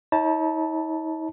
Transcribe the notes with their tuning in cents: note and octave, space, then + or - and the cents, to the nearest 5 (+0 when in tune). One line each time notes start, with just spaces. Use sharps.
D#4 +45 C#5 +0 A5 +0